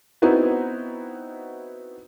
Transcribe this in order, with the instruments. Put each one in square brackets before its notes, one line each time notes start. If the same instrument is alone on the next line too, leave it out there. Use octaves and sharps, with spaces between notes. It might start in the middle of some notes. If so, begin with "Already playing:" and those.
[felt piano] B3 C4 D#4 E4 F#4 B4